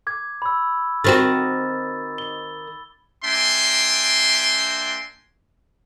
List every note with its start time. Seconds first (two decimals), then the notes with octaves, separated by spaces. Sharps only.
0.07 D6 G#6
0.42 B5 E6
1.04 D#3 C4 F#4 A6
2.18 G7
3.24 A#3 D4 E5 G5 G#5 C6